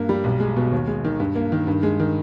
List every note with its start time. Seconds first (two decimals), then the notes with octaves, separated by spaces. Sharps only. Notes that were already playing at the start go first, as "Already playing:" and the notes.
Already playing: G2 A#3
0.09 G3
0.24 B1
0.40 G#3
0.57 B2
0.72 D#2
0.87 G#3
1.04 D#3
1.20 G2
1.35 A#3
1.52 D#3
1.67 G2
1.83 G#3
2.00 D#3